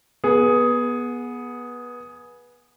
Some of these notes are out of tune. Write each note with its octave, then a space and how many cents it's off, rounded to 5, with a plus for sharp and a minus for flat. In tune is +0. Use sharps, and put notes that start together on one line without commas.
B3 -20 G#4 +5